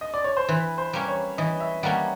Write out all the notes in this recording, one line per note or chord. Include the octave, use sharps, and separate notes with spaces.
D#5
D5
C#5
C5
E3 B4
C5
G3 A#3 C#4
C#5
E3 D#5
E5
G3 A#3 C#4 F#5